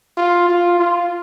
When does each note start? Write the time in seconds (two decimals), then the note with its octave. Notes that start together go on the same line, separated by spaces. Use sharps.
0.17 F4
0.49 F4
0.79 F4